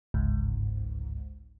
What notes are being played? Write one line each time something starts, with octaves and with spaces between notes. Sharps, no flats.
G1 C#2 G#2